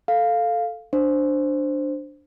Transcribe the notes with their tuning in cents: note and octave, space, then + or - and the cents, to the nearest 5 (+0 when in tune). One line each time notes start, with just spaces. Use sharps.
A4 +0 F5 +0
D4 +5 C5 +0